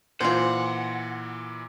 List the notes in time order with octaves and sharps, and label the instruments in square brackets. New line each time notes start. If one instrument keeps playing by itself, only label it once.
[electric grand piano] A#2 E3 [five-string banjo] F4 C5 [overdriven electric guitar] F#5